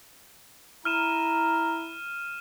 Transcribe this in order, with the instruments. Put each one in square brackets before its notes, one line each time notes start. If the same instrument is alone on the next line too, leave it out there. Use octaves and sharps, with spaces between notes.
[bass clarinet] E4 [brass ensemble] A#5 [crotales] F6 D#7 E7